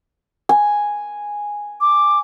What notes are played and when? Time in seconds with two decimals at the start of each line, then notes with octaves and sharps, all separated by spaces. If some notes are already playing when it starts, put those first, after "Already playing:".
0.49 G#5
1.81 D6